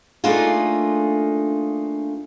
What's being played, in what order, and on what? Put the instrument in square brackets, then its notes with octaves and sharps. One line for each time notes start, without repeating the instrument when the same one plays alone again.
[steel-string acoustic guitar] A3 A#3 D4 D#4 F4 G#4